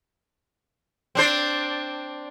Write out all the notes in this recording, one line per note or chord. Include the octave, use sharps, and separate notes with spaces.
C4 D4 C5